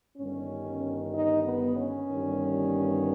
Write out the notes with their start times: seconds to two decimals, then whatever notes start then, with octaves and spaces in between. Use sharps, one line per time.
0.17 G1 G2 D#3 C#4
1.13 D#4
1.44 B3
1.77 C#4
2.07 G1 G2 D#3